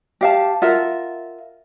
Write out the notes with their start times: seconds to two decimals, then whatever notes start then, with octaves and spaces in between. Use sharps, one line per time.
0.21 G4 F5 A5
0.62 F4 A#4 E5 F#5